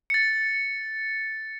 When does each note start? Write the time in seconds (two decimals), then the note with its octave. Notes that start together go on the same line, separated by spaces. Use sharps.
0.10 A6 C#7